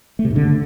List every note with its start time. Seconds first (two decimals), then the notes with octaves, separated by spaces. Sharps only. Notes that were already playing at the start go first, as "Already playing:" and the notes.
0.19 A3
0.25 C3
0.30 G#2
0.36 D3